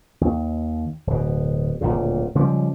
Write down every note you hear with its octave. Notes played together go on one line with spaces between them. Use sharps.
D#2
D1 B2
D1 G#1 A#2 C#3
C#3 F3 G3 G#3